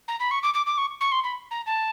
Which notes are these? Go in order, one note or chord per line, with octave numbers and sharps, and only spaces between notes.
A#5
B5
C#6
D6
D6
D6
C#6
C#6
C6
B5
A#5
A5